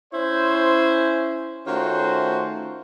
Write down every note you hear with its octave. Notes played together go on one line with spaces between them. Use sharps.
C#4 E4 C5
D#3 A3 C#4 F4 F#4 C5